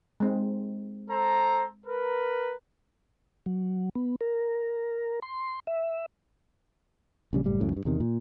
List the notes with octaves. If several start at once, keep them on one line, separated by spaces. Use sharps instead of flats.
G#3 C4 D#4
A4 C5 A#5
A#4 B4
F#3
B3
A#4
C6
E5
A#1 C#3 G3
F#1 A2 G3
C#2 F#2 A2
G2 D#3
E2 C3 D#3
A#2